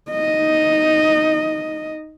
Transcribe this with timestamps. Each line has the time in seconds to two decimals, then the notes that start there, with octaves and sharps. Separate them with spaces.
0.11 D#4 D#5